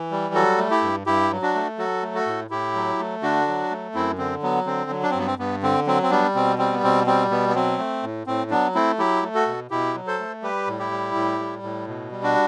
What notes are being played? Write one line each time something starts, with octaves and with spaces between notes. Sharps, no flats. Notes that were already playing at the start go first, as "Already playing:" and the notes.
Already playing: E3
G3
F#3 F#4 A4
A3
E4 G4
G2
G2 E4 G4
F#3
D4 F#4
A3
F#3 F#4 A4
A3
F#4 A4
A2
A2 E4 G4
F#3
A3
D3 D4 F#4
F#3
A3
F#2 C4 E4
D3 C4
F#3 B3
D3 C4
F#3
D4
C4
G2 B3
C4
G2 B3
D3 C4
F#3 C4
C4
G3 B3 D4
B2 C4
G3 C4
B3
B2 C4
G3 C4
B2 B3
B3
F#3 C4
A3
A2
A2 C4
F#3 B3 D4
A3 C4 E4
F#3 E4 G4
A3
F#4 A4
B2
B2 E4 G4
F#3
A4 C5
A3
G3 G4 B4
A2
E4 G4
G3
A2
G3
A2
B2
G3
D4 F#4